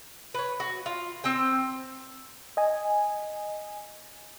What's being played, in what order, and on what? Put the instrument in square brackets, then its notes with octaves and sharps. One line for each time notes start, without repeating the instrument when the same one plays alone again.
[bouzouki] B4 C#5
F#4
F4
C4 C5 G5
[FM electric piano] D#5 G#5